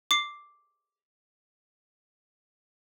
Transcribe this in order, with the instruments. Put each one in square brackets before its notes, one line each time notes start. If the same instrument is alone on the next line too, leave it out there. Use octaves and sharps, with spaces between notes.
[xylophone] D6 C7